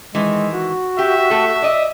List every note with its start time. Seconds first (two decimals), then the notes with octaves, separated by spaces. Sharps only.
0.15 D#3 E3 G#3
0.54 F#4
0.99 G4 E5
1.30 A3 A4
1.62 D5 D#5